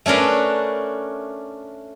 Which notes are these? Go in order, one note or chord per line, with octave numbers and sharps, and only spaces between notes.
A3 C#4 D4 A#4 B4